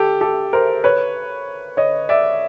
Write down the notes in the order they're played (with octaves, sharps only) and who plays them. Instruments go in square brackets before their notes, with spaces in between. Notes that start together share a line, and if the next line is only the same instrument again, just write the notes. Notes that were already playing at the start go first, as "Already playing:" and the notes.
Already playing: [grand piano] G4 A4
G4 A4
A#4 C5
B4 C#5
C#5 D#5
D5 E5